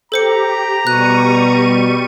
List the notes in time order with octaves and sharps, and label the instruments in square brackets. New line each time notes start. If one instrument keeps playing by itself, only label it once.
[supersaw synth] G4 [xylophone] A4 C5 C#7 [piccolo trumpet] A#5
[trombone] B2 [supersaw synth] G3 C#6 D#7 [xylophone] F#6